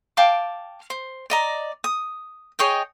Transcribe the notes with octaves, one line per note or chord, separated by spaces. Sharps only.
F5 G5 A5 D6
C5
D5 D#5 A#5
D#6
G#4 C#5 D#5 G5